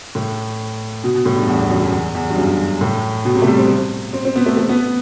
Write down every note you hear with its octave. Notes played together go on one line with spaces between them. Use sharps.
A2
B2
B2
A2
G2
E2
E2
F#2
F#2
E2
E2
G2
F#2
A2
B2
C3
A3
G3
C4
C4
C4
B3
A3
A3
B3